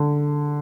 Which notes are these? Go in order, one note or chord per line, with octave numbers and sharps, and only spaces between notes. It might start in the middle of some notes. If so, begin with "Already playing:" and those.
Already playing: D3